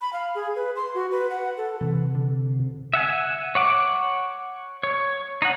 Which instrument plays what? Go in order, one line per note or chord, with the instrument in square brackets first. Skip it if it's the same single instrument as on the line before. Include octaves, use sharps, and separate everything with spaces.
[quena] B5
F5
G#4
B4
C6
F#4
B4
F#5
A4
[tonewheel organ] C3 [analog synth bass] E3
[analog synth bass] D3
[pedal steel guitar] E5 F#5 G#5
C#5 F#5 D6
C#5
D#4 C#5 F#5